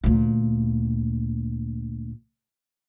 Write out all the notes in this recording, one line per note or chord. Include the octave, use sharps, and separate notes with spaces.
D2 A#2